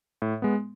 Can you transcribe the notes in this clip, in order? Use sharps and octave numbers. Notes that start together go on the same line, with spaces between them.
A2
G#3 B3